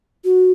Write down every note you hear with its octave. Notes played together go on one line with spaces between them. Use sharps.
F#4